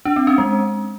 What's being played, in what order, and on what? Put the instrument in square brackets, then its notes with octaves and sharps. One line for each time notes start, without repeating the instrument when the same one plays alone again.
[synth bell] D4
C4
C#4
G#3